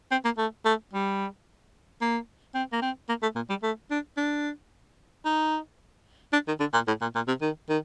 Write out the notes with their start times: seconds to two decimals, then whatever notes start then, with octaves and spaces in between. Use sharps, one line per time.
0.11 C4
0.25 A#3
0.38 A3
0.65 A3
0.93 G3
2.01 A#3
2.55 C4
2.72 A#3
2.82 C4
3.09 A#3
3.22 A3
3.36 A#2
3.50 G3
3.63 A3
3.91 D4
4.17 D4
5.25 D#4
6.33 D4
6.48 D#3
6.60 D3
6.74 A#2
6.88 A2
7.01 A#2
7.15 A#2
7.28 C3
7.42 D#3
7.69 D#3